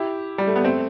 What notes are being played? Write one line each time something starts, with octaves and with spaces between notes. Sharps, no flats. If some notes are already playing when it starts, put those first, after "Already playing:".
Already playing: E4 G4
G3
A3
B3
A3 C4